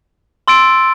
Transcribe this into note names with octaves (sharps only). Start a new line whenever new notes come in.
C6 E6 A6 D7